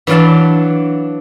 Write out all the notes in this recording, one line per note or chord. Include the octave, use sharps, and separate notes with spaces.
E3 F#3 D4 F5 A5